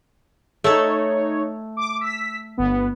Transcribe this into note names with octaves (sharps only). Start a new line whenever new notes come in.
A3 D#4 A4 C#5
D6
E6 B6
G1 B3